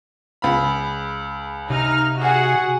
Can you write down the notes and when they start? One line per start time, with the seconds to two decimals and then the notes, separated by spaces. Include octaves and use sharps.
0.42 C#2 B5
1.70 C3 D#4 F6
2.21 F#4 G#4 F#5